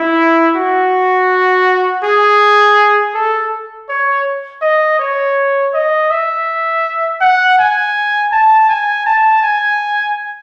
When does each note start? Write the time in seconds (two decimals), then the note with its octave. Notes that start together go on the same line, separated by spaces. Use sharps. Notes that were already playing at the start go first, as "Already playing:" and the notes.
Already playing: E4
0.56 F#4
2.04 G#4
3.15 A4
3.89 C#5
4.62 D#5
4.99 C#5
5.74 D#5
6.10 E5
7.21 F#5
7.59 G#5
8.32 A5
8.69 G#5
9.06 A5
9.43 G#5